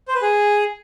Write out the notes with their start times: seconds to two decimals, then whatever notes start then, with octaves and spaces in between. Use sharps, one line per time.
0.08 C5
0.15 B4
0.22 G#4